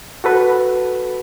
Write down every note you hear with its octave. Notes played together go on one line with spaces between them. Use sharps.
F#4 A4 B4